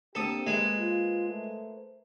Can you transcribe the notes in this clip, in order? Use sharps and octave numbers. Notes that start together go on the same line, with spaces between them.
D3 A#3 C4 G4 A4 D#6
G#3 A#3 B4 C5
F4
A3